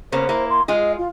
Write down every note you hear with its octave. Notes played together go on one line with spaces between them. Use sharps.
C#3 A#3 B3 C5
A#3 E4
C6
G#3 F4 G#4 D#5
F4